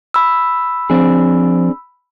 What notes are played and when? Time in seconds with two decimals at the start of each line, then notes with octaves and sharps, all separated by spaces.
0.14 B5 E6
0.90 F3 C4 D4 G#4